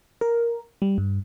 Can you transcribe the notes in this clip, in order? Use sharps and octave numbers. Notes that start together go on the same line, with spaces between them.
A#4
G3
G2